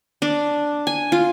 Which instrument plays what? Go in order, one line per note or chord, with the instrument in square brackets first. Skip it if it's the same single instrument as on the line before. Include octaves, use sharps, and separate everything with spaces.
[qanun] D4
G#5
F4